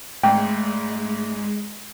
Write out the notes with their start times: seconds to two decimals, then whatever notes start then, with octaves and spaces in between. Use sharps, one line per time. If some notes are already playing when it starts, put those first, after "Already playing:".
0.23 G#1 G#2 G#3 A3 G5